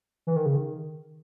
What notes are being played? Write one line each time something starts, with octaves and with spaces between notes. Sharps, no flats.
E3
D#3
C#3
D#3